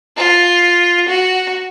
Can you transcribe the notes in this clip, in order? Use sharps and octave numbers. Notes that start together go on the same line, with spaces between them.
F4
F#4